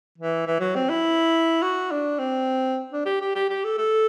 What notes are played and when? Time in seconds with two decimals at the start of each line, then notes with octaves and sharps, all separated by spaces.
0.18 E3
0.47 E3
0.60 F#3
0.75 C4
0.90 E4
1.62 F#4
1.91 D4
2.19 C4
2.92 D4
3.06 G4
3.21 G4
3.35 G4
3.50 G4
3.64 A4
3.78 A4